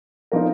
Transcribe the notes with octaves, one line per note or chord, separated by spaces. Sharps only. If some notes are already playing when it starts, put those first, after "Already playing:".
F3 B3 D#4 A#4